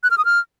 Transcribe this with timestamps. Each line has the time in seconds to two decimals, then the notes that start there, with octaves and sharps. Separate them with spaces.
0.03 F#6
0.11 F6
0.18 D#6
0.25 F6